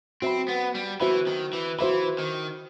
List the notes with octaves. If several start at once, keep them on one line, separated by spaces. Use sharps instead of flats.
C4 F#4 C5 E5 B5
B3
G3
E3 F#4 C5 E5 B5
D#3
E3
E3 F#4 C5 E5 B5
D#3